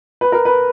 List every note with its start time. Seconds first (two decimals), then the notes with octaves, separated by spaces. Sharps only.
0.21 B4
0.32 A#4
0.45 B4